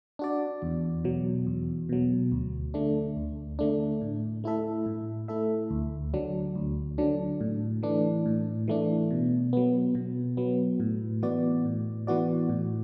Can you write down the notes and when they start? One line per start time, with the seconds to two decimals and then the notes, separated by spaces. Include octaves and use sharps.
0.19 D4 F#4 D5
0.62 E2
1.04 B2 F#3
1.47 E2
1.89 B2 F#3
2.32 D2
2.74 D3 A3 D4
3.17 D2
3.59 D3 A3 D4
4.01 A2
4.44 A3 E4 A4 E5
4.86 A2
5.28 A3 E4 A4 E5
5.70 D2
6.14 D3 F#3 D4
6.56 D2
6.98 D3 F#3 D4
7.41 A2
7.83 E3 A3 D4
8.26 A2
8.68 E3 A3 D4
9.11 B2
9.53 F#3 B3
9.95 B2
10.37 F#3 B3
10.80 A2
11.22 E3 B3 F#4 D5
11.65 A2
12.07 E3 B3 F#4 D5
12.49 A2